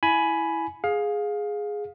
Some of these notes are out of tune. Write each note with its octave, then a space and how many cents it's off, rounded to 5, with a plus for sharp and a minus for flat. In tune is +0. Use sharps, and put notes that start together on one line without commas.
E4 -5 G#5 +15 B5 +0
G#4 +0 F5 +20